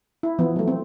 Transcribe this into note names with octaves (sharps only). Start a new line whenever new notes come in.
E4
E3 F3 B3
F#3 A3
C4